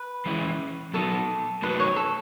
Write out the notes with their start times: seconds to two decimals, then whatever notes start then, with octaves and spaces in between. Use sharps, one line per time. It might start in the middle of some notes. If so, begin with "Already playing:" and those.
Already playing: B4
0.26 E3 G#3 C#4 E4
0.94 F#3 B3 D#4 A4
1.62 F#3 A3 D#4 B4
1.80 C#5
1.96 A4